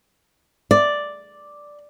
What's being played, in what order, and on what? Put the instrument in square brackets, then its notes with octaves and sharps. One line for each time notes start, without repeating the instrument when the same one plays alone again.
[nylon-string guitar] D5